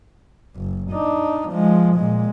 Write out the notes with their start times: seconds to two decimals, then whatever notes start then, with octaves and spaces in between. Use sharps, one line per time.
0.56 F#1
0.91 D4 D#4
1.49 F3 G#3
1.95 A#2 G#3